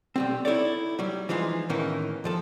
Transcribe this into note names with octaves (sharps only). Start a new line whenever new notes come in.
B1 G3 C4
D#4 E4 F#4 A4 C#5 D5
F#3 G3
E3 F3 G#3 D#4 F4
A2 D#3 E3 A#3 C#4 D#4
F2 F3 A4